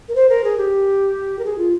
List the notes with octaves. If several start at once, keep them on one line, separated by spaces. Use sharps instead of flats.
A#4
C5
A#4
G#4
G4
A#4
G#4
F4